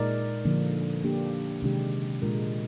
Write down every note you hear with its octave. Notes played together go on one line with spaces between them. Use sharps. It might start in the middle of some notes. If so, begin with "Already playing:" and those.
Already playing: A#2 G#3 D#4 A#4 D5
D3 F3 A#3 D4
A#3 D4 G4
C3 D#3 G#3 D4 G4
A#2 G#3 D4 F4 A#4